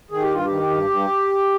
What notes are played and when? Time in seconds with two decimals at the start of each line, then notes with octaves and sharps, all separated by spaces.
0.11 D#3 G#4
0.22 G4
0.31 G2 F4
0.45 G4
0.50 D#3
0.70 G2
0.90 G2